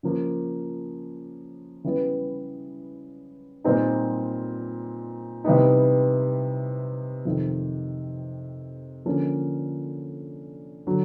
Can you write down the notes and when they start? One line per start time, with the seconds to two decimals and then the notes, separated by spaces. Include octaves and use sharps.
0.03 C#3 F3 A#3
1.84 C#3 E3 G3 B3 E4
3.64 A#2 G3 C4 D#4
5.44 C3 E3 G3 B3 D#4
7.25 F2 C3 D#3
9.05 D3 F3 A#3 C#4
10.87 D3 F#3